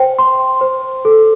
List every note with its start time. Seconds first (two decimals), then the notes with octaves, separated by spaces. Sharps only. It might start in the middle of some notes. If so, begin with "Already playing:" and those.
Already playing: C5 G5
0.19 C6
0.61 C5
1.05 A4